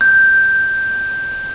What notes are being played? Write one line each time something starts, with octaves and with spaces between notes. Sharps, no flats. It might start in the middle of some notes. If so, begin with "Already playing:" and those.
G6